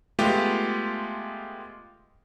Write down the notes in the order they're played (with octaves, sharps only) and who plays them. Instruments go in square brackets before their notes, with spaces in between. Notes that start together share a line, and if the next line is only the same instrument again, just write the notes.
[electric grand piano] G#3 A3 B3 F4 G4